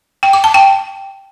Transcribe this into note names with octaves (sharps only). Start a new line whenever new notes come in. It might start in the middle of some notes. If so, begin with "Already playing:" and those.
G5
D6
A5
G5